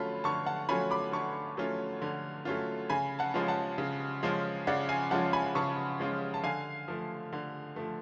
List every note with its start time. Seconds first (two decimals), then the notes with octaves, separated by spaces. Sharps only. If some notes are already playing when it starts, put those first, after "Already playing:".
Already playing: D3 F#3 A3 C#4 F4 A5 B5
0.24 D3 A5 C#6
0.46 F#5 A5
0.69 F#3 A3 C#4 F4 G#5 B5
0.91 B5 D6
1.12 D3 A5 C#6
1.57 F#3 A3 C#4 F4
2.02 D3
2.45 F#3 A3 C#4 F4
2.90 C#3 G#5 B5
3.19 F#5 A5
3.34 F3 G#3 C#4 F4
3.48 F#5 A5
3.78 C#3
4.23 F3 G#3 C#4 F4
4.67 C#3 D5 F#5
4.89 F5 G#5
5.11 F3 G#3 C#4 F4 F#5 A5
5.33 G#5 B5
5.55 C#3 A5 C#6
6.00 F3 G#3 C#4 F4
6.34 A5
6.44 D3 F5 G#5
6.88 F3 A3
7.33 D3
7.76 F3 A3